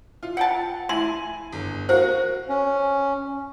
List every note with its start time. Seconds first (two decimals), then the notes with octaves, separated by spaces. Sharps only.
0.23 F4
0.37 F#5 G5 A5
0.89 E4 G#5 C6
1.52 G1
1.89 F#4 A#4 C5 F5
2.49 C#4